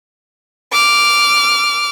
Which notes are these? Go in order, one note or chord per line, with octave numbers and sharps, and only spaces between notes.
D6 F6